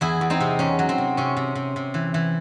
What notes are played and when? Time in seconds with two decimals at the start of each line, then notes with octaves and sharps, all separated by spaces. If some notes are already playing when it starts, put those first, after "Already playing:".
0.01 E2 E4 G#4
0.21 E2
0.30 C4 D#4
0.40 C3
0.59 E2 C#4
0.79 F#3
0.89 C4
0.98 C3
1.17 C3 C#4
1.37 C3
1.55 C3
1.76 C3
1.94 E3
2.14 E3